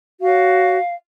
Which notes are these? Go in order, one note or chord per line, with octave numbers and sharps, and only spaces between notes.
F#4 C#5 F5